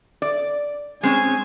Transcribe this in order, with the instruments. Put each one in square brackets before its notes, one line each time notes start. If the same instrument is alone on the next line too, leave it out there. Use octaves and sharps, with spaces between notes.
[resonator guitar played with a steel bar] D5
[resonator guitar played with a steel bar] G#3 C4 C#4 [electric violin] G#5